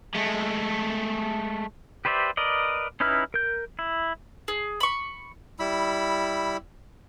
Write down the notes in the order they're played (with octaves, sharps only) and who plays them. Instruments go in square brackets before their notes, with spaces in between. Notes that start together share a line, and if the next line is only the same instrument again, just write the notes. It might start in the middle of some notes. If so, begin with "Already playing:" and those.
[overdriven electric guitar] G#3 A3
[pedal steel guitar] G4 B4 C5 D5 E5
A#4 B4 D5 D#5
C#4 D#4 E4 B4 F6
A#4 G6
E4
[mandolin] G#4
B5 C#6
[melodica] G3 E4 B5 E6